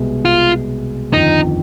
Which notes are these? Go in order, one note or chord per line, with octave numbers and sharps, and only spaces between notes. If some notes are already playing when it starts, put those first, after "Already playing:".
Already playing: C2 B2 G#3
F4
G1 F2 D#3 D#4